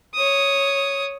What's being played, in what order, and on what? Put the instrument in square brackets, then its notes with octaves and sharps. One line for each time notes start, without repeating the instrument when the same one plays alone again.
[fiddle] C#5 D#6